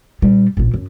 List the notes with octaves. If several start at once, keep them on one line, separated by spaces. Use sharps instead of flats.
A#2 G3
A1 A#2
F#2